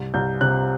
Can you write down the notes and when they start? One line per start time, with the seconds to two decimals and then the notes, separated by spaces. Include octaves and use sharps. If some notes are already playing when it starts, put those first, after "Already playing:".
Already playing: C2
0.14 C2 G6
0.41 C3 F#6